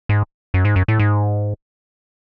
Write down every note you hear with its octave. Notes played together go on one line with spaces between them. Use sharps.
G#2
F#2
G#2
F#2
A2
G#2